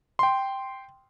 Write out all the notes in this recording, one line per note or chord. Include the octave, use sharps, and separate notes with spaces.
G5 C6